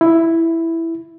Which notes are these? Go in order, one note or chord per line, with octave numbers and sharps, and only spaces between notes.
E4